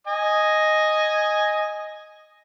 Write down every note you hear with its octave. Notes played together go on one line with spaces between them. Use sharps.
D#5 G#5 D#6